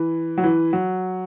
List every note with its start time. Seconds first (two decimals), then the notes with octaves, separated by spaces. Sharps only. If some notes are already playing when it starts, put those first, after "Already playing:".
Already playing: E3
0.38 F#3
0.44 E3
0.73 F#3